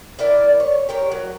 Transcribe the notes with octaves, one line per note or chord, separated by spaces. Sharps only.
D4 E4 A#4 D5
C#5
G4 A#4 C#5
F#3